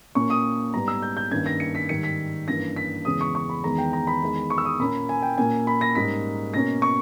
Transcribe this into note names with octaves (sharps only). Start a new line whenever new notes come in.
A#2 A#3 C#4 C#6
D#6
G#2 G3 B3 A#5
E6
G6
G6
G2 D#3 A#3 C#4 G#6
A#6
C#7
B6
G#2 D#3 G3 C#7
B6
G2 E3 A#3 C#4 A#6
B6
E2 C#3 E3 G#3 C#4 D#6
C#6
C#6
B5
E2 D#3 G#3 A#5
G5
A#5
B5
E2 D#3 G#3
C#6
E6
D#6
A#2 A#3 C#4 B5
G#5
G5
A#2 A#3 C#4 G#5
B5
A#6
G#2 G3 A#3 C#4 B6
B2 A#3 C#4 A#6
C#6